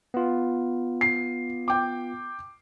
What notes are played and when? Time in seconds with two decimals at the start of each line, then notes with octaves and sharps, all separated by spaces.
0.14 B3 F4
1.01 C7
1.68 G5 D6